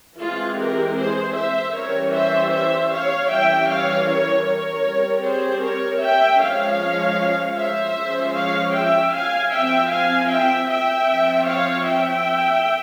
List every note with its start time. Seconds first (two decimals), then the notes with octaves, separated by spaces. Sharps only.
0.19 E3 G#3 C4 F4 G#4
0.58 G4 A#4
0.97 G#4 C5
1.36 C5 E5
1.74 E3 G3 C#4 A#4 C#5
2.13 C5 E5
2.52 C5 E5
2.91 C#5 F5
3.29 E3 G3 C#4 E5 G5
3.69 C#5 F5
4.07 A#4 C#5
4.46 A#4 C#5
4.85 G3
4.90 C4
5.24 G#4 C5
5.63 A#4 C#5
6.03 E5 G5
6.41 F3 G#3 C#4 C#5 F5
7.57 C5 E5
7.96 F3 G#3 C#4
8.35 C#5 F5
8.74 E5 G5
9.13 F5 G#5
9.52 F3 C4 E5 G5
9.90 F5 G#5
10.29 E5 G5
10.69 E5 G5
11.08 F3 C4
11.46 C#5 F5
11.85 E5 G5